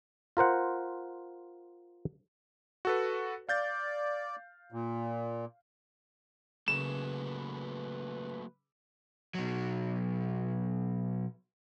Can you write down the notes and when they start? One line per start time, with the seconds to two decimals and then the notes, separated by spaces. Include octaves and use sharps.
0.37 F4 A#4 C5 F#5
2.85 F#4 A4 B4
3.49 D5 F5 G6 A6
4.72 A#2
6.68 C#3 F#3 A3 A#3 B4 E7
9.35 B2 F#3